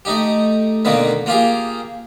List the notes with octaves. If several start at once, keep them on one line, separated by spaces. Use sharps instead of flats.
A3 D#4 G4
B2 D3 D#3 A#3 B3
A#3 F4 G4 G#4